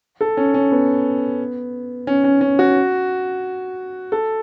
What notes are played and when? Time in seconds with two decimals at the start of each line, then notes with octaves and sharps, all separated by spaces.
0.21 A4
0.37 C#4
0.54 C#4
0.72 B3
2.07 C#4
2.24 C#4
2.41 C#4
2.59 F#4
4.12 A4